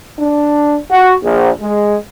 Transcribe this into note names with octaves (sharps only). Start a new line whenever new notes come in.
D4
F#4
A#1
G#3